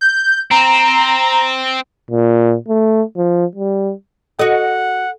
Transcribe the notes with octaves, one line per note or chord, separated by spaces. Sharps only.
G6
C4 A#5
A#2
A3
F3
G3
F#4 A4 D#5 F#5 D#6